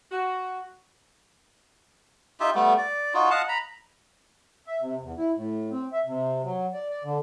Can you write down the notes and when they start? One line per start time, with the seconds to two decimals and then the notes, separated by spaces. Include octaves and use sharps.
0.11 F#4
2.40 D#4 F4 G4 E5
2.55 G3 A3 B3
2.78 D5
3.14 D#4 F4 F#4
3.30 D#5 F5 F#5 A5
3.49 A#5 B5
4.67 E5
4.81 C3
5.02 E2
5.18 E4
5.35 A2
5.71 C4
5.93 E5
6.06 C3
6.43 F#3
6.73 D5
6.89 D5
7.04 D3